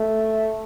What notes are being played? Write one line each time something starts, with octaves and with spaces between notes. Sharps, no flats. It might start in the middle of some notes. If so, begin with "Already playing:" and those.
Already playing: A3